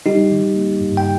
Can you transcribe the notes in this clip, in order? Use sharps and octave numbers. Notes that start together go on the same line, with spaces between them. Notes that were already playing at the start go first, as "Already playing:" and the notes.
G3 D#4 G4
D#3
A#3
G2
G5